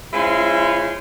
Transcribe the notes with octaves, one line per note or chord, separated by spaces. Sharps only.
G#3 C#4 E4 F4 C5